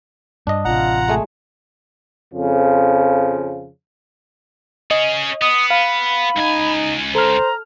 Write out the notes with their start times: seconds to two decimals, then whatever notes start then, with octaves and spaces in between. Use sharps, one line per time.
0.47 G2 D4 D#5
0.65 A1 C3 F4 F#5 A#5
1.08 G#3 A3 G#4
2.35 F2 C#3 F3
4.91 C#4 G#4 D#5
5.42 B3 D#6
5.70 F5 B5
6.36 C#2 D#4 G#5
7.15 A4 C5 A#5 F6